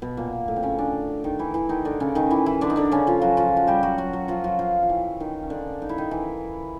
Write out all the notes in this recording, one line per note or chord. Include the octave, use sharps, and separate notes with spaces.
B2 B3
A#2 A#3
A2 A3
C4
C#3 C#4
D3 D4
D#3 D#4
E3 E4
E3 E4
D#3 D#4
D3 D4
C#3 C#4
D#3 D#4
E3 E4
E3 E4
D3 D4
D#4
D3 D4
C#3 C#4
F3 F4
F#3 F#4
F3 F4
F#4
G3 G4
F#3 F#4
F#3 F#4
F#3 F#4
F3 F4
F#3 F#4
F3 F4
F4
E3 E4
D#3 D#4
C#4
D3 D4
D#4
E4
D#3 D#4
E3 E4